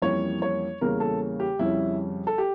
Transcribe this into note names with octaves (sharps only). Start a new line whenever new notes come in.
F2 E3 G3 A#3 C#4 C#5
C#5
E2 C#3 G3 A#3 C#4 A#4
A4
G4
F2 C#3 G3 C#4 E4
A4
G4